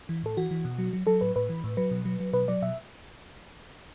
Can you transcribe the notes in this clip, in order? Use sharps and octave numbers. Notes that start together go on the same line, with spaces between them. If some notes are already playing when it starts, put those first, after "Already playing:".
E3
A2 A4
E3 F#4
E3
B2
F#3
F#3
F#3 A4
A2 B4
A2 B4
E3
A2
F#3 B4
B2
F#3
F#3
B2 B4
F#3 D5
B2 E5